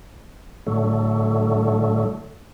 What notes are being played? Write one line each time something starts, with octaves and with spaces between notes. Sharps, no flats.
A2 D3 F#3 A3